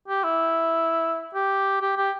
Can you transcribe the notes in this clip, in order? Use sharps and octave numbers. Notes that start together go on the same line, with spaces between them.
G4
E4
G4
G4
G4